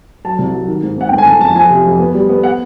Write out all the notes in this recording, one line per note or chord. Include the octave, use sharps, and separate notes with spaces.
F#3 A5
C2
F#3
D#3
G#2
G#2 F#5
G1 G5
G#5
G1 A5
F2 A5
F3 G#5
C3
F2
B3
G3
B3
F#5